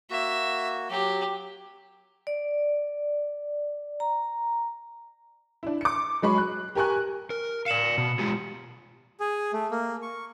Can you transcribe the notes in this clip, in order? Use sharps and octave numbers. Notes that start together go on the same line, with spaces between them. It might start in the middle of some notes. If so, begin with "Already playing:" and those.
A#3 F#4 E5
F#3 G4
D5
A#5
D4 E4
D6 C#7
F#3 G#3 B5 C#6
F#6
G4 A#4 G#5 C#6 F#6
A#4
D5 F5 C#7 E7 F#7
B2
G#3 F4 G4
G#4
A3
A#3
C#6